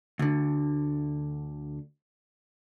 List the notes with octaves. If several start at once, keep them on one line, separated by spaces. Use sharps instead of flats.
D2 D3